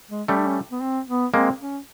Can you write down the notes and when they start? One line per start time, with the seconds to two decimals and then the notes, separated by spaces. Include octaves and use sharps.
0.11 G#3
0.28 G3 A3 C#4
0.38 D4
0.46 C#4
0.71 B3
0.82 C4
1.08 B3
1.33 G#3 A#3 C4
1.60 C#4